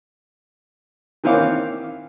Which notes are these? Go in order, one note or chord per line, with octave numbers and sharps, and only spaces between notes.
D#3 E3 C4 C#5 F5 D6